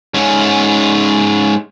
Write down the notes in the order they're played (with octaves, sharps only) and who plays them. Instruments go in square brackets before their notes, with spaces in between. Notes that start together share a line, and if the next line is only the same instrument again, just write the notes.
[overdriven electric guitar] G#2 C#4